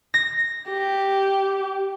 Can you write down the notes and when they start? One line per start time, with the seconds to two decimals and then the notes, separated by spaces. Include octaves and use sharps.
0.14 A#6
0.70 G4